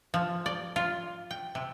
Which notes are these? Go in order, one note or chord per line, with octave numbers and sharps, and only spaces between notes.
F3
D5
F4
G5
C3